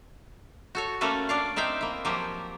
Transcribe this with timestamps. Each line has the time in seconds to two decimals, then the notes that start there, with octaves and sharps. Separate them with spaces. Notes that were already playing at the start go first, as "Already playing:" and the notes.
0.75 F#4 A4 C#5
1.01 A3 A#3 C#4 A4 B4
1.29 D4 D5 F5
1.56 C4 D#4 E5 F5 G5
1.81 A#3 E4
2.05 F3 F#3 A#3 G4